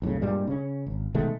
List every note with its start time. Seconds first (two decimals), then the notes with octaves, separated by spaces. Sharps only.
0.02 B1 F2 A2 C#3
0.21 G2 A#2 G3 G#3
0.47 C#3 C#4
0.87 G#1
1.14 B2 D#3 G#3 A3